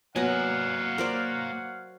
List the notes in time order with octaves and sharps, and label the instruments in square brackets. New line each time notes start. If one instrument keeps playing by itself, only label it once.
[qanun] F#3 B3 D#5 [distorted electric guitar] A#3 G#5 [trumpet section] C#5 F5 F#5
[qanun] A#4 C5 D5